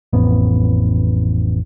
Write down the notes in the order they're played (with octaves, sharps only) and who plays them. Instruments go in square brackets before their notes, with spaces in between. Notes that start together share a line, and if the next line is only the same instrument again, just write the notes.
[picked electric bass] A1 F2 B3